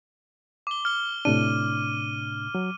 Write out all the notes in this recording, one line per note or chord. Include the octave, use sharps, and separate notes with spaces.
D6 G7
F6 G7
A2 C3 D4 D#7
F#3